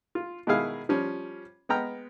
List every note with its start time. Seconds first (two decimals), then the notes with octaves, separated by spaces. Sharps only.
0.15 F4
0.47 B2 D#3 G#3 E4 G#4 F5
0.89 F3 G3 C#4
1.69 G#3 B3 G5 A#5 F6